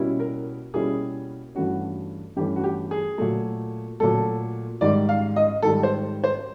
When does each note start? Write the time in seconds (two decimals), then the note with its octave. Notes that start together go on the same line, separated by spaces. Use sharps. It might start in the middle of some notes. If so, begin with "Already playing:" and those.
Already playing: B2 G3 A#3 C#4 E4
0.20 A#4
0.74 B2 G3 A#3 C#4 E4 G#4
1.55 G2 E3 A3 C#4 F#4
2.36 G2 E3 A3 C#4 G4
2.56 F#4
2.64 G4
2.91 G#4
3.18 A#2 F#3 A3
4.00 A#2 F#3 A3 A4
4.81 G#2 D#3 G3 D5
5.09 F5
5.36 D#5
5.63 G#2 D#3 G3 A4
5.83 C5
6.24 C5